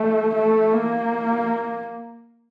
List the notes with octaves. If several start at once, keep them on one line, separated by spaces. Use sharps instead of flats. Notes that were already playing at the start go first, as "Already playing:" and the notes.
Already playing: A3
A3
A#3